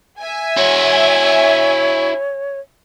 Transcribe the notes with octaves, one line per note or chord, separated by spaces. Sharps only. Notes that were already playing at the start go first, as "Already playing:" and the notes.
E5 G#5
E4 F#4 C#5